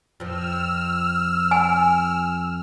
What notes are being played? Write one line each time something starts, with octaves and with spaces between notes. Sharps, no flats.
F2 F3 E6 F6
G#5